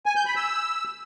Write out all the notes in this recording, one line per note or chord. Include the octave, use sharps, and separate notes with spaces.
G#5
G6
B5
E6